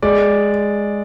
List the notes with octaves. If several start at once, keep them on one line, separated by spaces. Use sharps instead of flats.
G#3 D5